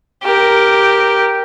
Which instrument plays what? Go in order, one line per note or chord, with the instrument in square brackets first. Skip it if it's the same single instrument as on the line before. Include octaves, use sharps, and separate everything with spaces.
[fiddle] G4 A#4